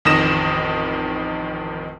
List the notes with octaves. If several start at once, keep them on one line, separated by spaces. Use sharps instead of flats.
A1 F2 D#3 D#6 A#6 E7